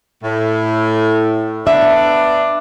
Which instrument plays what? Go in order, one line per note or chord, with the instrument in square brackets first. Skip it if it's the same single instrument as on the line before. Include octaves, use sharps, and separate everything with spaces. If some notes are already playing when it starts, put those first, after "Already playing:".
[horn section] A2
[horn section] B3 D4 [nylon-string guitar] E5